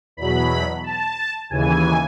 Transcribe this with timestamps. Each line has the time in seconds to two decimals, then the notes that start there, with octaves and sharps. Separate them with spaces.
0.17 E2 B2 F#3 B5
0.84 A5
1.50 D#2 C#3 E3 G#5